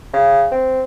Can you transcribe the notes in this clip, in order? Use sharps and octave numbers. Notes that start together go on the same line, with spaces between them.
C#3
C4